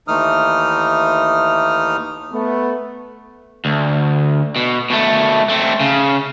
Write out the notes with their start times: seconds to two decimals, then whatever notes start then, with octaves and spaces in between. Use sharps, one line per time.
0.08 D#2 E3 A3 D#4 D#6 F6
2.31 A3 B3
3.65 D2
4.56 B2
4.90 B2 A3
5.49 A3 C4
5.80 C#3